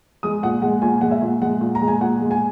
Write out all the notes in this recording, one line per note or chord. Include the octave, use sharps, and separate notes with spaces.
G#3 D#6
A#2 F#5
G#3 F#5
A#2 G#5
G#3 F#5
E5
A#2
G#3 F#5
A#2
A#5
G#3
G#5
A#2 F#5
G#3
G#5